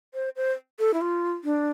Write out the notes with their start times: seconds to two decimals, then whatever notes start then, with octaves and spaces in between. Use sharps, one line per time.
0.14 C5
0.36 C5
0.79 A4
0.94 E4
1.01 F4
1.44 D4